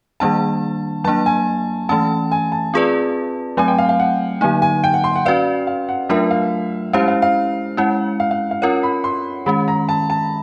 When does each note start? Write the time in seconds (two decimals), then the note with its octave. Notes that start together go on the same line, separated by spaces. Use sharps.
0.20 D#3 G3 A#3 D4 A5
1.04 F#3 A#3 D4 A5
1.26 G#5
1.89 E3 A3 C#4 A5
2.31 G#5
2.52 A5
2.74 C4 F4 G#4 B4 D5
3.57 F#3 A3 C4 G#5
3.68 G5
3.78 F5
3.89 F5
4.00 F#5
4.41 D3 F#3 A#3 D#4 G#5
4.62 G#5
4.84 G5
4.94 F#5
5.04 C6
5.16 F#5
5.25 C#4 F#4 B4 D5 F5
5.67 F5
5.89 F#5
6.09 F#3 A3 D4 F4 A#4 E5
6.31 F5
6.93 G#3 C#4 E4 G4 C5 F5
7.08 F5
7.22 F5
7.77 G#3 C#4 E4 F#5
8.20 F5
8.31 F5
8.51 F5
8.62 C#4 F4 A#4 C#5 F#5
8.83 B5
9.04 C6
9.46 D#3 G#3 C#4 B5
9.68 A#5
9.89 A5
10.10 A5